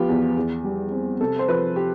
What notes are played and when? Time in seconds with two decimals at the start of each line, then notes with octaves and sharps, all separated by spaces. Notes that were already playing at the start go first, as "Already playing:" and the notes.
Already playing: F3 B3 F4 G4
0.09 E2
0.37 E2
0.64 G3
0.92 C4
1.21 C3 A4
1.39 C5
1.48 F3 B4
1.76 G4